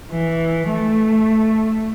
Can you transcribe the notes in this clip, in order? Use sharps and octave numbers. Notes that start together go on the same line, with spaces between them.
E3
A3